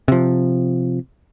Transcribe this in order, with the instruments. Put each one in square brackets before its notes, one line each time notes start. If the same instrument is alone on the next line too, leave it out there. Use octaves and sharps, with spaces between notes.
[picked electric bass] C3 F3